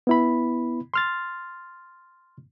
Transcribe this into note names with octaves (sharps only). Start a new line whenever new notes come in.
B3 E4 B5
C6 F6 A6